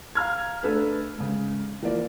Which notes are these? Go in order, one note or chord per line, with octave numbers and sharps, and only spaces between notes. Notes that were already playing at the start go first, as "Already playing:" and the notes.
F5 A#5 F6 G#6
A3 D4 A4 B4
G#2 C#3
E3 F3 A#3 D5